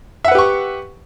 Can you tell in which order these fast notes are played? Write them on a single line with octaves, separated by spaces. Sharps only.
E5 F#5 B4 G4 C#6